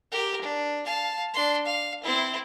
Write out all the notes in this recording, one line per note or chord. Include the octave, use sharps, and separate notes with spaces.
G4 A#4
D4
F5 A5
D4 C6
F5
C4 E4